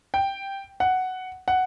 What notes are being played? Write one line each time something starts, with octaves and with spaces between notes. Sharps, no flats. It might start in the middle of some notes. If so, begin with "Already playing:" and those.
G5
F#5
F#5